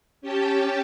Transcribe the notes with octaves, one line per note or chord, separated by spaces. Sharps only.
C#4 G4 G5 A5